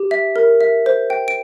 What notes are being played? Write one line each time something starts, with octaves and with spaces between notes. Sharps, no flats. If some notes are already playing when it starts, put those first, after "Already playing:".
Already playing: G4
E5
A#4
E5
C5
G5
D7